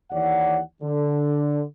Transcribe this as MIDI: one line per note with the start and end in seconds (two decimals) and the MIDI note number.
0.11 0.59 39
0.11 0.59 52
0.11 0.59 73
0.11 0.59 74
0.11 0.59 78
0.83 1.63 50